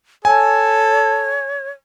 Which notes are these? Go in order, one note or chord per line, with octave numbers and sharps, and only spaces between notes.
A4 C#5 G#5